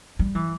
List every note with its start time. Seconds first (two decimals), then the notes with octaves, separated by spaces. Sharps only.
0.19 G3
0.35 E3